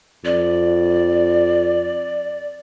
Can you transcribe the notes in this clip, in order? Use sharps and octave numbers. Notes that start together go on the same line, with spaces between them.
F2 D5